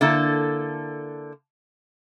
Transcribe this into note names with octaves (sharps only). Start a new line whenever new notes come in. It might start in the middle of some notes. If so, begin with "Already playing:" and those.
D3 A#3 E4 A4